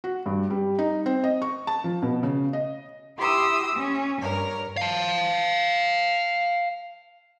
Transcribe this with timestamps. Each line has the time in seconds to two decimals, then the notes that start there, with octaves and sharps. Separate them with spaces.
0.04 F#4
0.26 G2
0.50 G3
0.79 D#4
1.06 C4
1.24 D#5
1.42 C#6
1.67 A5
1.84 F3
2.02 B2
2.23 C#3
2.53 D#5
3.16 E4 G4 C6 D#6 E6
3.75 C#4
4.20 G2 A#4 C#5
4.77 F5 A5